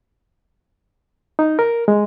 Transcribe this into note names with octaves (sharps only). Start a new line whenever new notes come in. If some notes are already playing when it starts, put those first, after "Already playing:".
D#4
A#4
G#3